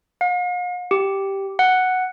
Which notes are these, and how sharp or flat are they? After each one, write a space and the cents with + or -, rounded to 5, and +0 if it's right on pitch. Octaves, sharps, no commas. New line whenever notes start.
F5 +45
G4 -5
F#5 +0